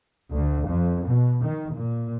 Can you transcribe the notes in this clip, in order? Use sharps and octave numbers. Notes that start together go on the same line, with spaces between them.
D2
F2
B2
D#3
A#2